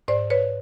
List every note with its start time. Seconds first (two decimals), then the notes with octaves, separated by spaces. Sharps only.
0.08 G#2 C5 D5
0.30 B4 C#5